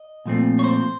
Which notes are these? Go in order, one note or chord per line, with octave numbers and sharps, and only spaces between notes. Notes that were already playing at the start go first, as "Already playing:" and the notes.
Already playing: D#5
A#2 F3 A3 C4
C#5
C5